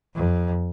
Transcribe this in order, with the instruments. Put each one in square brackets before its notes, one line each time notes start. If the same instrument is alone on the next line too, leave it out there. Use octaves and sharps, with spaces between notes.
[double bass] F2